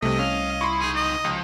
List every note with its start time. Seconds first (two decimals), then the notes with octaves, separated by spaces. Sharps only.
0.02 C2 C3 A3 D#5
0.19 C#4 F5
0.61 E4 C6 C#6
0.80 C#2 D#4 G#4
0.96 D#5
1.25 C#2 F3